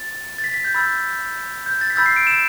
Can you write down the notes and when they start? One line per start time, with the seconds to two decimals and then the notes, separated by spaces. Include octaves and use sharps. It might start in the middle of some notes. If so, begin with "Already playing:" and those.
Already playing: A6
0.38 A6
0.44 B6
0.54 B6
0.64 G6
0.74 B5 E6 G6 A6
1.66 G6
1.81 A6
1.90 B6
1.96 B5 E6 G6 A6
2.06 C7
2.16 D7
2.27 E7